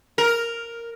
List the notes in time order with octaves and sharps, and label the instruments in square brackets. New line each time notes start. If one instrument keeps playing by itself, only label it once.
[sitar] A#4